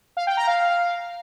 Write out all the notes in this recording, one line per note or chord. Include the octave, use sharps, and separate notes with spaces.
F5
G5
A#5
F5